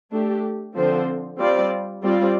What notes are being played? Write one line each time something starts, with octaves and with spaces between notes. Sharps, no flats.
A3 D4 G4
D3 F3 C4 A4 C5
G3 C4 F4 D5
G3 C4 F4 D5